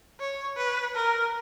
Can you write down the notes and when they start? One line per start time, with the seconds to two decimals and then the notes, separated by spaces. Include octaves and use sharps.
0.20 C#5
0.57 B4
0.96 A#4